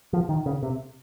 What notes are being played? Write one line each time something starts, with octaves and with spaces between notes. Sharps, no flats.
F3
D#3
C#3
C3